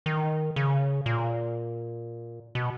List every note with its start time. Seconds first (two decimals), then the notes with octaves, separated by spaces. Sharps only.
0.06 D#3
0.56 C#3
1.06 A#2
2.55 B2